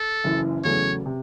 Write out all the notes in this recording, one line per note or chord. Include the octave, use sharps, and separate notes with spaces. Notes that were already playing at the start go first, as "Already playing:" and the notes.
Already playing: A4
F#1 F#2 E3
E2 C#3 F#3 A3 C#5
C3